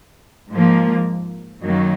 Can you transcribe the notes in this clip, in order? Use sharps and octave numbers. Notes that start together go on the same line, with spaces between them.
G#2 F3 A#3
F#2 D#3 F#3 A#3